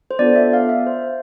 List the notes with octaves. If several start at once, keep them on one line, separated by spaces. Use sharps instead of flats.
C5
B3 D4 F4 A4 D5
E5
F5
E5
C5